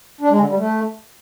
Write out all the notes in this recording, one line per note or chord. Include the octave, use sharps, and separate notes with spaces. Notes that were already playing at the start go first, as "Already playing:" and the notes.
D4
G#3
D3
G3
A3